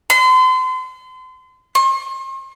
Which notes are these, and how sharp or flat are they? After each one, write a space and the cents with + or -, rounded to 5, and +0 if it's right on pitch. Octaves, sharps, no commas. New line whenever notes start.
C6 -35
C6 +45